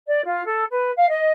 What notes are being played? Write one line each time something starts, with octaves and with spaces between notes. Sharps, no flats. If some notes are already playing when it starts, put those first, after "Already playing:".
D5
F4
A4
B4
F5
D#5